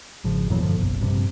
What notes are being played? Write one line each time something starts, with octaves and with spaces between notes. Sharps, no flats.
G#1 C#3 F3
E2 A#2 E3 F#3
G2 D3 F3
F#1 B1
A#1 G2 C3